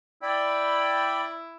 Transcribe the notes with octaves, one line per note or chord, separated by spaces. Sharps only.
E4 D5 G5 B5